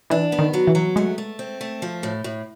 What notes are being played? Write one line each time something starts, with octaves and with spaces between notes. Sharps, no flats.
E3 D4
B3
D#3
F#3
E3
F#3
G#3 A3
A3
C4
A3
F3
A2
A2